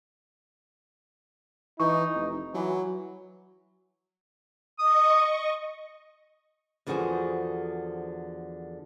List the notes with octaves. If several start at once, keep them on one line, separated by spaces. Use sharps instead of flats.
E3 D#4 C#6
F1
E3 F#3
D#5 C#6 D#6
E2 D3 F3 F#4 G#4 C5